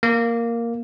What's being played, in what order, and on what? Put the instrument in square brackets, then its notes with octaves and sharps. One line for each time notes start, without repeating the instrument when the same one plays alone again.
[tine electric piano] A#3